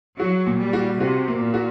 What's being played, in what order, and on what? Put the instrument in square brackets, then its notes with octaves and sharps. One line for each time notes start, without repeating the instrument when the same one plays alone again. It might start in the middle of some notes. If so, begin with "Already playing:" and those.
[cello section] F#3 [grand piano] F#4
[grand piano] A#2
[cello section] G3
[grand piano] F#4
[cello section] C3 [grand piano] F#4
[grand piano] A#3
[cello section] A#2
[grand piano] F#4